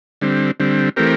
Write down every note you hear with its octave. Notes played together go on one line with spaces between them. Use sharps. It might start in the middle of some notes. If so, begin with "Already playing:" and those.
D3 G3 C4
D3 G3 C4
E3 A3 C4 G4 A#4